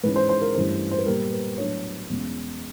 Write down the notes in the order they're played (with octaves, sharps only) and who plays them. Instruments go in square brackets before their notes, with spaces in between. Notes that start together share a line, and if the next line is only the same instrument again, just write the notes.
[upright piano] G#2 E3 G#3 C#4 B4
C5
C5
A#4
G2 E3 A3 C#4 C5
C5
B4
A#2 G3 B3 A#4
B4
A2 F#3 B3 D4 C#5
E2 B2 G#3 C#4